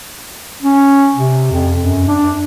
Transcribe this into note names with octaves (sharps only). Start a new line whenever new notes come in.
C#4
C3
F2
F#2
D4